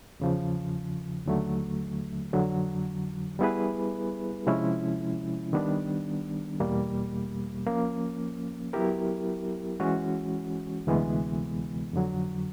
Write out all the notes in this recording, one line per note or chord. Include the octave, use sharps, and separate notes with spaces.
E2 C#3 F3
D#2 D3 F#3 A3
F2 D3 F#3
G3 B3 E4 G#4 B4
C3 F3 G#3 C#4 E4
D#3 G3 B3 D4
E2 B2 G3 A#3
F3 A#3 C#4
F#3 B3 E4 G4 A#4
E3 G#3 C#4 F#4
D2 C3 E3 G#3 B3
F2 D3 F#3